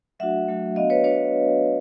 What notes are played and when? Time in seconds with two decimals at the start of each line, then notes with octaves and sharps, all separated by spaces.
0.19 F#3 A3 D4 F#4 E5 F#5
0.48 F#3 A3 D4 F#4
0.76 B3 D4 F#4 D#5 F5
0.90 B4 C#5
1.04 B3 D4 F#4 B4 C#5